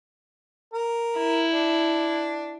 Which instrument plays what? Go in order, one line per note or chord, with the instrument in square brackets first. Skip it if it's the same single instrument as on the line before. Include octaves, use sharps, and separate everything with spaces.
[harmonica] A#4
[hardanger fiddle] E4
[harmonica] D4